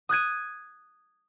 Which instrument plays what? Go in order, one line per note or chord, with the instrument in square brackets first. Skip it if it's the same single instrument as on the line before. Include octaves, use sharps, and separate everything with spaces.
[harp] D#6 F#6 G#6 D#7